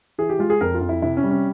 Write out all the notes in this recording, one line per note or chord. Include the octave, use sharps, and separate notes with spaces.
E3 G#4
G4
G#3 F4
G#4
F2 A#4
F4
F2
E4
C3 E4
C#4
G3
C#4